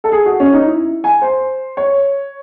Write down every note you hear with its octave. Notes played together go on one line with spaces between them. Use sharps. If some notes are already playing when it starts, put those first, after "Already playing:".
A4
G#4
F#4
C#4
D#4
E4
G#5
C5
C#5